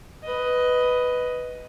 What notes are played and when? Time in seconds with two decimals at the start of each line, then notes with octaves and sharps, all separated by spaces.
0.24 B4 D#5